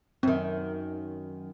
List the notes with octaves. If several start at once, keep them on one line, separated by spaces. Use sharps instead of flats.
F#2 D#3 C4